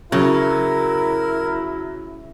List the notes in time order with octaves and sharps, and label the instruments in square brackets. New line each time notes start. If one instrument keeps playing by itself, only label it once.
[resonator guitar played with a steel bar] C#3 [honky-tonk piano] F#3 [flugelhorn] E4 [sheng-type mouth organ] A#4